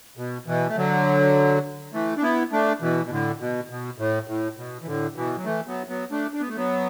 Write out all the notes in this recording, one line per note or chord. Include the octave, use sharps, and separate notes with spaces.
B2
B2 E3
A3
D3 F#3
E3 A3
D4
B3 E4
A3 D4
B2 E3
B2
A2 D3
B2
B2
A2
A2
B2
E3
A2 D3
B2 E3
F#3
E3 A3
F#3 B3
F#3 B3
A3 D4
D4
B3
A3
F#3 B3